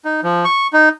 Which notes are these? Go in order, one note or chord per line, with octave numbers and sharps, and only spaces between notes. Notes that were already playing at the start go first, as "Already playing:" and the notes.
D#4
F3
C#6
D#4